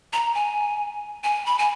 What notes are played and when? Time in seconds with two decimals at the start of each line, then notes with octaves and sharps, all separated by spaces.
0.13 A#5
0.35 G#5
1.24 G#5
1.46 B5
1.58 G#5